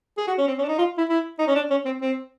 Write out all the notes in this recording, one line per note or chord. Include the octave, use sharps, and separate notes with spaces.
G#4
F#4
C#4
C4
C#4
D4
D#4
F4
E4
E4
D#4
C#4
D4
C#4
C4
C4